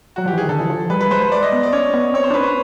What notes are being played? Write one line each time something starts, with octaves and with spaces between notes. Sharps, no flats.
F#3 F#4
F3 G4
E3
D#3 G#4
D3 A4
E3
F3
G3 B4
B4
G#3 C5
C5
D5
D#5
B3
D5
C#4 C#5
B3
C4 C#5
C5
D4
C#4 B4
C5